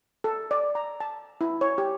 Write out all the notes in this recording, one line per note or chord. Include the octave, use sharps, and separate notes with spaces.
A4
D5
A#5
A5
E4
C#5
G4